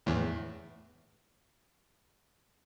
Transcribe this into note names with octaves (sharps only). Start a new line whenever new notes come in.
E2 A2